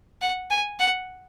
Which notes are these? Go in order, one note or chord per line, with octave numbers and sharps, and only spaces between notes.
F#5
G#5
F#5